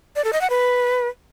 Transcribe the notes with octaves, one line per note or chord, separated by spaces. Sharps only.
D5
A4
D#5
F#5
B4